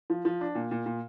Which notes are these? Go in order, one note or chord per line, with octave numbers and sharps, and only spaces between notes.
F3
F3
D4
A#2
A#2
A#2